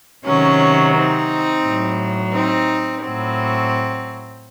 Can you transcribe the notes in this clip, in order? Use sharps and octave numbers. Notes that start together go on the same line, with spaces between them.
C3 D#3 F#3 C#4
C4 D#4
A2 F#3
C4 D#4
A2 F#3 C4